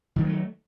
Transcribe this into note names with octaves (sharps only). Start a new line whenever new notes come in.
D#3 F#3 G3 A3